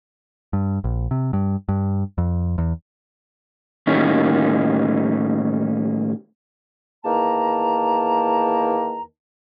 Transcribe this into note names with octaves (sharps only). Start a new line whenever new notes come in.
G2
A#1
C3
G2
G2
F2
E2
A2 D#3 G3 A#3 C#4 D#4
E2 D#3 A#3 A5 A#5